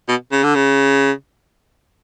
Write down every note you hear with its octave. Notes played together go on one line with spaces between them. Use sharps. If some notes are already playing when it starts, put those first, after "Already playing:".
B2
C#3
D3
C#3